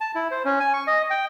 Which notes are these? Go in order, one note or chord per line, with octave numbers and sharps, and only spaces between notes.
A5
E4
C5
C#4
G#5
C#6
D#5
G5